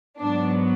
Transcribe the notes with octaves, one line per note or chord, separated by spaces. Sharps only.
G#2 F#3 B3 D4